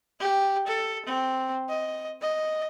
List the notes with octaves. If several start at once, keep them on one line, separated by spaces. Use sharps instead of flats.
G4
A4
C4
D#5
D#5